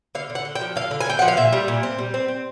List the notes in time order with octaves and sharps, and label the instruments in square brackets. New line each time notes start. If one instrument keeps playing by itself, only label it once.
[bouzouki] D3 F5
D3
F#5
D3
G5
F3
D3 F5
D3
G#5
D3 G5
F3 F#5
F5
A#2 E5
G3
A#2
C4
G3
C4
C4